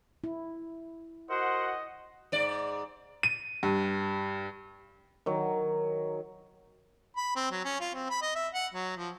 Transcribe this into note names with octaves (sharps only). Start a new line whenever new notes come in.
E4
F#4 A#4 C5 D#5 F#5
G#2 D5
D#7
G2
D#3 F#3
B5
C4
F#3
C#4
F4
C4
B5
D#5
E5
F#5
F#3
F3